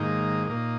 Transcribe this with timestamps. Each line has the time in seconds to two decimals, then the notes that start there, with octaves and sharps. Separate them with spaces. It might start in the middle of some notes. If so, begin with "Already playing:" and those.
Already playing: G#2 D#3 A#3 D#4
0.47 A#2 A#3 D#4